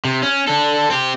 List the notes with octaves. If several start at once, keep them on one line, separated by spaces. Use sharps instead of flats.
C3
C#4
D4 A4
C4 G4